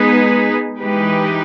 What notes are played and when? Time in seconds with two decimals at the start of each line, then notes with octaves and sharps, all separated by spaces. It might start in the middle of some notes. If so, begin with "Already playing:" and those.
Already playing: G#3 B3 D#4 G#4 B4
0.80 E3 G#3 D#4 G4 B4